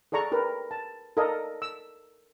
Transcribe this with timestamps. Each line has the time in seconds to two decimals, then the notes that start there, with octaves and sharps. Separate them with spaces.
0.12 G#4 A4 D5 A#5 C#6
0.32 G4 A#4 B4
0.71 A5
1.17 A4 A#4 D5 D#5 F5
1.62 E6